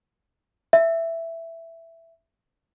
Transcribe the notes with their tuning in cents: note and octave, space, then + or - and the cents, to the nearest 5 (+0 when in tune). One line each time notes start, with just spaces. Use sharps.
E5 +5